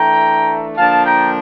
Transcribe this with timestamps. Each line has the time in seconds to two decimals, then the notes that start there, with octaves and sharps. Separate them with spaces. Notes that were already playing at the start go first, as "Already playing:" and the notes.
Already playing: E3 A3 D4 G5 A#5
0.77 D3 F3 A#3 D4 F5 A5
1.05 G5 A#5